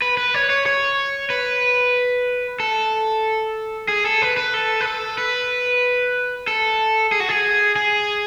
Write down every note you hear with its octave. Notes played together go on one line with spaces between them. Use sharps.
B4
B4
C#5
C#5
C#5
B4
A4
G#4
A4
B4
B4
A4
B4
A4
B4
A4
G#4
F#4
G#4
G#4